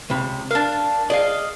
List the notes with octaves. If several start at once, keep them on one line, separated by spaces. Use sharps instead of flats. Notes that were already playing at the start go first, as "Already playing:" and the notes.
C#2 C3 B5
D4 A#4 F5
G#4 D5 D#5 F5